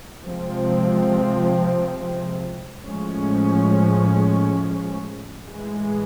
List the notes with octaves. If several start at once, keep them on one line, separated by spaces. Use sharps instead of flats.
C3 F3 G#3 C4
A2 F3 G#3 C#4
A2 E3 G#3